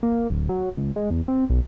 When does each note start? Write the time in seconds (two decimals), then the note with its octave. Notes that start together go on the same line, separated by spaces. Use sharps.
0.03 A#3
0.30 D1
0.49 F#3
0.77 C#2
0.96 G#3
1.11 E2
1.28 C4
1.50 B1